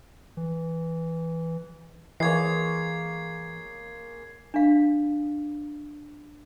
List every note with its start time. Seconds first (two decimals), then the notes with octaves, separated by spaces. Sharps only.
0.37 E3
2.20 E3 G#3 A#3 C#5 G#6 C7
4.54 D4 F5